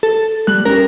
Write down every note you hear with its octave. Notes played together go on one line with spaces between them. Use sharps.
A4
G3 F#6 F#7
C#4 G4 A#4